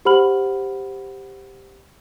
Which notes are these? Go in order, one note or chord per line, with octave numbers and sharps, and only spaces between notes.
G4 C5 F#5 B5 F6 F#7